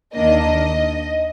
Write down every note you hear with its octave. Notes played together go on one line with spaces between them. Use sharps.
D#2 D#3 A#3 D4 D#5